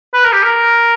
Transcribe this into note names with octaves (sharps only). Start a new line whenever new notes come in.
B4
A#4
G4
A#4